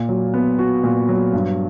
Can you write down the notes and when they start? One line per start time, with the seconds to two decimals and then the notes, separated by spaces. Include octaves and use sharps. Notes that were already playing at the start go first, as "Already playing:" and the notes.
Already playing: A#2
0.09 F#3
0.34 B3
0.59 F#4
0.83 A#2
1.09 F#3
1.33 G2